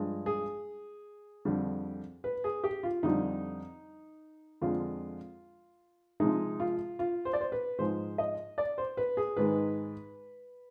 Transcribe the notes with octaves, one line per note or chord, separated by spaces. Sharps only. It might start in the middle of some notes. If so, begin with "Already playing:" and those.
Already playing: G2 F3 G#3
G#4
F2 D3 G3
B4
G#4
G4
F4
F2 D3 G3 D#4
F2 D3 G#3 F4
C3 F3 G#3 D#4
F4
F4
C5
D5
C5
B4
G#2 F3 G#3 C5
D#5
D5
C5
B4
G#4
G#2 D#3 G#3 B4